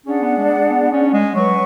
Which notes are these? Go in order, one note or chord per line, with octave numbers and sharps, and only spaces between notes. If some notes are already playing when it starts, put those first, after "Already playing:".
C#4 D4 G#4 D5 F#5
B3
G#3
B3
B3
C#4
G#3
F#3 B4 F#5 C#6